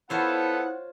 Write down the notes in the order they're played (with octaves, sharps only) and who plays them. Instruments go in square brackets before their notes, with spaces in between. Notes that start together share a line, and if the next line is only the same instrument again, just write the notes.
[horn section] B3 A4 [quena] E4 [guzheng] F4 C5 C#5 [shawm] F#5